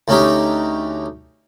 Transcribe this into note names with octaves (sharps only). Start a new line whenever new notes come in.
D2 C#4 D#4 G4